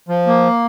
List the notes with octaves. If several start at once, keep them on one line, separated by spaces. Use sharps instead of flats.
F3
A#3